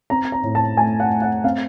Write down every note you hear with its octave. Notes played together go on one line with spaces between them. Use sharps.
C4 A#5
A#5
A2
A5
A3 G#5
F#5
A3
F#5
C4 F5